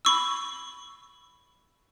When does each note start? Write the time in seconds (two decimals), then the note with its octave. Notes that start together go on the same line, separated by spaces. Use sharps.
0.05 B5 C#6 E6